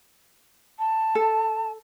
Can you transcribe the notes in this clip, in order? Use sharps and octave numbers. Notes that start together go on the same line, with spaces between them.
A5
A4